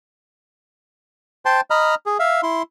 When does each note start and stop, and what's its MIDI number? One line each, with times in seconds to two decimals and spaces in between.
1.45 1.61 72
1.45 1.61 79
1.45 1.61 81
1.45 1.61 84
1.70 1.95 75
1.70 1.95 82
1.70 1.95 83
1.70 1.95 89
2.06 2.18 68
2.19 2.41 76
2.19 2.41 77
2.43 2.62 64
2.43 2.62 84